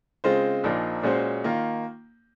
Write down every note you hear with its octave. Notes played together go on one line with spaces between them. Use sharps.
C#3 G#3 C4 F4 C5
A#1 A#2 F3 A#3 D#4
A#2 G#3 C#4 F#4 C5
D#3 A#3 F4